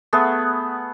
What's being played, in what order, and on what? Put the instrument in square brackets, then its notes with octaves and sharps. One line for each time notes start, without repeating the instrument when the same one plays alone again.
[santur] A3 B3 G#4 F#5